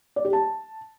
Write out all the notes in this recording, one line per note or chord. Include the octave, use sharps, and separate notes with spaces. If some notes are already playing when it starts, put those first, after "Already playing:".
D5
G4
A5